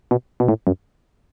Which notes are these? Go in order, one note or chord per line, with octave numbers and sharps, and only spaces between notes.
B2
B2
A2
F#2